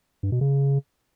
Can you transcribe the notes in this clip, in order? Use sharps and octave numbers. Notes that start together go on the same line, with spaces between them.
G2
B2
C#3